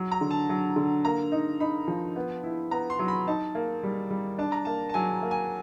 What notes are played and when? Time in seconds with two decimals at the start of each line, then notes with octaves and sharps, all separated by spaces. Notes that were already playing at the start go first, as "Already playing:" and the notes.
Already playing: F#3
0.11 A#5
0.21 D3
0.31 A5
0.49 F#3
0.76 D3
1.05 A#3 A#5
1.32 D#4
1.60 D#4 B5
1.88 F3
2.16 B3
2.43 E4
2.71 B3 A#5
2.90 C6
2.99 F#3
3.08 B5
3.27 D#4 A5
3.55 A#3
3.83 G3
4.11 G3
4.38 D4 A5
4.52 A#5
4.65 A#3 A5
4.89 A5
4.94 F#3 G#5
5.22 A#3
5.31 G#5